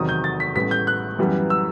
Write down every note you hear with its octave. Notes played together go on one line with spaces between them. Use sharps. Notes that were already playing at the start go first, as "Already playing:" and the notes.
Already playing: E2 C3 D#3 F#3 D#6
G6
A6
B6
A1 A2 G3 B3 B6
G6
F#6
F#2 E3 G3 B3
E6